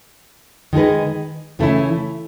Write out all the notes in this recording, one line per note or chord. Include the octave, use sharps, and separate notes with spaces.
D#3 G#3 D#4 G#4 B4
C#3 E3 A3 C#4 E4